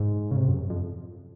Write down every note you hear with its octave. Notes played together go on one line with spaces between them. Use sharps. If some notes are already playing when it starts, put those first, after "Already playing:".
Already playing: G#2
C#3
C3
F#2
F2